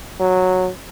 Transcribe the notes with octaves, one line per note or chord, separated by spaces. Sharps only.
F#3